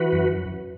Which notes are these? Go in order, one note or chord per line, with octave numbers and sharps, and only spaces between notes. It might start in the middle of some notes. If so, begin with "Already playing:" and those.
Already playing: E3 F#4 B4
F#2